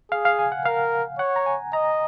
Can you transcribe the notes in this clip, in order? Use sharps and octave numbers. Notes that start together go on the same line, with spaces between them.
G#4 F5
F5
G#5
F#5
A#4 F5
C#5 F#5
A#5
G#5
D#5 A#5